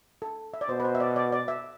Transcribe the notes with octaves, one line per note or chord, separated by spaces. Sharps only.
A4
E5
D5
B2 C5
B4
C5
E5
D5
D5
D5
E5